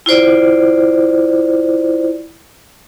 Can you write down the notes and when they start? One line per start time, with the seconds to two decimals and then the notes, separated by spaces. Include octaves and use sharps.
0.06 E4 F4 C5 D5